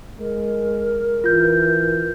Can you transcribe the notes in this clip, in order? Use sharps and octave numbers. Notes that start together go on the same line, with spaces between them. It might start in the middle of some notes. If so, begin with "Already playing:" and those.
G#3 A#4
E3 F4 G6